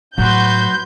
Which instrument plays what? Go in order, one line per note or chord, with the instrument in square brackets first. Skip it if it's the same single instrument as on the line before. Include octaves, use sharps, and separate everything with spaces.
[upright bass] A2 [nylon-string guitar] F#3 [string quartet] F#4 B4 C6 [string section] G6